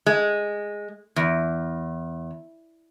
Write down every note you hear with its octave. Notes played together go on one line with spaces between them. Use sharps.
G#3
E2